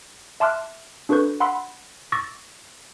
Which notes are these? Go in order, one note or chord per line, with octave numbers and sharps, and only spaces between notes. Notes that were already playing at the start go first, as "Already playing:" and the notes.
E5 A5 C6 D6 F6 F#6
D4 F#4 A4 B4 C#6 G6
F#5 B5 C6 E6
C#6 D6 E6 A6 A#6